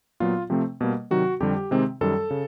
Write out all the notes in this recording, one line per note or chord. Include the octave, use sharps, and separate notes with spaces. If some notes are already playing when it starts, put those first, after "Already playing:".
A#2 F#3 B3 F4
C3 F3 A3 C4
B2 G3 A#3
C3 D#3 F#3 F#4
F2 D3 G3 G4
C3 D#3 G#3 C4
F#2 D#3 G3 A4
C#3